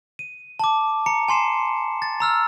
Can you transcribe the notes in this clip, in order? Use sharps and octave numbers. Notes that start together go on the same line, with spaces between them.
D#7
A5 D6
A#5 C#7
G#5 C6 C7 E7
A6
A#5 E6 F6